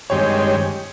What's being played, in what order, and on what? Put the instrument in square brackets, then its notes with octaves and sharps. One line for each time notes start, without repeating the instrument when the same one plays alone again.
[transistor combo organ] G2 D#3 G#3 C4 G4 [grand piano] C#5
[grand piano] C#5